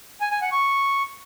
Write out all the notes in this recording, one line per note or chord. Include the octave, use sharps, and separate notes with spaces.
G#5
G#5
F#5
C#6